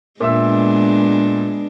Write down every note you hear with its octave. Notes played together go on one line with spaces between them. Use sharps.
A#2 G#3 B3 D4 E5 E6